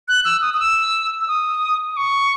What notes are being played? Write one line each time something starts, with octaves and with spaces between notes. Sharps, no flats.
F#6
E6
D#6
D#6
E6
E6
D#6
D#6
C#6